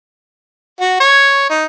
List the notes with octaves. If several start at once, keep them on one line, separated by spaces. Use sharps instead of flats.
F#4
C#5
D#4